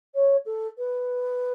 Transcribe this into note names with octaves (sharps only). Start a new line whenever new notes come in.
C#5
A4
B4